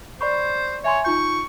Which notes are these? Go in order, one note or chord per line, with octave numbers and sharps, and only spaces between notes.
C5 D5 B5 C#6
C#5 E5 G#5 C6
D#4 F4 C#6 G6